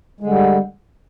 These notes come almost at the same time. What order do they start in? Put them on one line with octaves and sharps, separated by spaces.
G#3 D3 G3